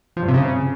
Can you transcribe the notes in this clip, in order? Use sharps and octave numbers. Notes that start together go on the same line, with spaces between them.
F3
G2
C3
C#3